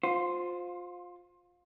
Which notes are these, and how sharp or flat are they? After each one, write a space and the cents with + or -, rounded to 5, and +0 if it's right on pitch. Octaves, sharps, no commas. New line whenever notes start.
F4 +25 C5 +0